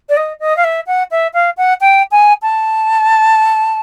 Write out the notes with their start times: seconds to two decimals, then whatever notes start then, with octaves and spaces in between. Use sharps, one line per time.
0.09 D5
0.17 D#5
0.40 D#5
0.57 F5
0.64 E5
0.87 F#5
1.11 E5
1.33 F5
1.57 F#5
1.81 G5
2.11 G#5
2.42 A5